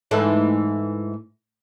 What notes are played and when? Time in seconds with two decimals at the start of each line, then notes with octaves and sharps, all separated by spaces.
0.11 G#2 E3 A3